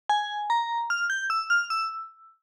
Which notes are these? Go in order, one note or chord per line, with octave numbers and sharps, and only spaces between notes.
G#5
A#5
F6
G6
E6
F6
E6